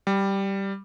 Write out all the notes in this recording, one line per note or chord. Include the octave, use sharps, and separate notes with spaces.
G3